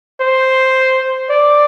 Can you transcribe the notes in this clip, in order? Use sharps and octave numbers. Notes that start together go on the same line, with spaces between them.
C5
D5